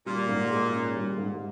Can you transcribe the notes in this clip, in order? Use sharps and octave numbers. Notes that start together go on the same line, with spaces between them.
A#2 G3
G#2
G#4
C#4
G3
G#2